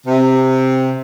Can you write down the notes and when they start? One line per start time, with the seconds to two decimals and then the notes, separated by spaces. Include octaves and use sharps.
0.07 C3